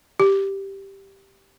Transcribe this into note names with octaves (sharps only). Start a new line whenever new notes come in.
G4